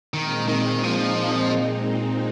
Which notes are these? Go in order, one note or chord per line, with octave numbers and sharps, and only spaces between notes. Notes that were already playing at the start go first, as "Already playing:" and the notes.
A#2 D#3 G#3 C4 D#4
D#3
F3